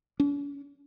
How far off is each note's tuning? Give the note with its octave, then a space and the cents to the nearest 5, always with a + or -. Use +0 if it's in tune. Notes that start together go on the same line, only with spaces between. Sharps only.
C#4 +45